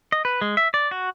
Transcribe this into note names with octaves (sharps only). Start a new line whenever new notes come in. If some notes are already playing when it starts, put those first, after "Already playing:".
D#5
B4
G#3
E5
D5
F#4